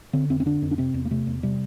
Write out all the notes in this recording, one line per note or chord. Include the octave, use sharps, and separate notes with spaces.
D3 C4
F2 C4
C4
D3 D4
F2
D4
C3 C4
E2
A#3
C3 A3
E2
C3 G3